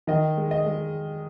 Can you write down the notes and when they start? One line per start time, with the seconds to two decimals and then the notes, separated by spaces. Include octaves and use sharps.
0.07 D#3 D#5
0.37 G#3
0.51 D#5
0.66 G#3